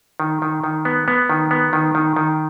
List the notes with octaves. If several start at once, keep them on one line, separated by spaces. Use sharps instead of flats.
D#3
D#3
D#3
B3
B3
D#3
B3
D#3
D#3
D#3